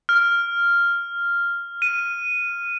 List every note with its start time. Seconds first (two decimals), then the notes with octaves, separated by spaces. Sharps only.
0.09 F6
1.82 D#7